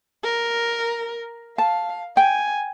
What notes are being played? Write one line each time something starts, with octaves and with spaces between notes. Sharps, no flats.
A#4
F5 A5
G5 G#5